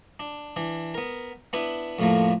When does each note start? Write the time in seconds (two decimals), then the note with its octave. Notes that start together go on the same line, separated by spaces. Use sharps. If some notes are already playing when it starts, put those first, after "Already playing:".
0.20 D4
0.56 E3 D4
0.94 B3 A#4
1.53 B3 D4 E4 B4
1.99 F2 A2 F3 A3 A#3